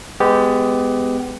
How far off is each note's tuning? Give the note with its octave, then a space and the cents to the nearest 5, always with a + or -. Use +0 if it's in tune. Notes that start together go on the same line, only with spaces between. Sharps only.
G#3 +0 B3 +25 G4 +0